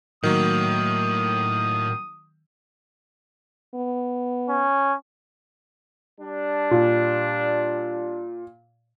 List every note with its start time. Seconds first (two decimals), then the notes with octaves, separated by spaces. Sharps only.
0.23 A2 D#3 F#3 A#3 D#6
3.74 B3
4.49 C#4
6.20 G3 D4
6.71 A#2